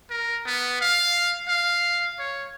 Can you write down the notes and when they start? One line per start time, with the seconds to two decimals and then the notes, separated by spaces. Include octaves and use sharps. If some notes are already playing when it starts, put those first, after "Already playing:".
0.10 A#4
0.46 B3
0.81 F5
1.48 F5
2.19 C#5